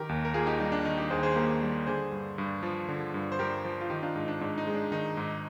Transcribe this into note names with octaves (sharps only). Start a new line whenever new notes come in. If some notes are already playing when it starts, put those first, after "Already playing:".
Already playing: D#3 G4 A#4
D#2
A#4
A#3 F4 G#4
D#4 G4
G3 D#4
D4
D#3 D#4
D#4 G4
D#2 G#4 C5
G#4 C5
A#3 G4 A#4
G3
D3 G#4 C5
G2
G2
F3
D3
G2
C5
G2 G4 A#4
F3
F4
D#3 D#4 G4
D4 F4
G#2 D#4
D4
G#2 D4
D#4
G#3
D4
D#3 D#4
G#2